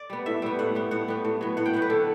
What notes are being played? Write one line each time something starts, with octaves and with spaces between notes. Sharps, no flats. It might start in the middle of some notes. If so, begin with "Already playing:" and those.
Already playing: D5
G3 B3
A2 E5
G3 B3
A2 F#5
G3 B3
A2 F#5
G3 B3
A2
F#3 B3
A2 F#5
G5
F#3 B3 F#5
B4
D3 A4